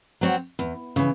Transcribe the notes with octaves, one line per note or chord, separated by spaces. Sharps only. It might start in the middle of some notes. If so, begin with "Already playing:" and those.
F#3 C4 F#4 C#5
E2
C#3 E3